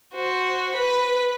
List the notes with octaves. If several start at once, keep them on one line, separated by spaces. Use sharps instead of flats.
F#4 C5
B4 B5